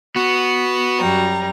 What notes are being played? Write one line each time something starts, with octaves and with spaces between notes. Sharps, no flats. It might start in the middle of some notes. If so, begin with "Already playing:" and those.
B3 F#4
F#2 G3 A#5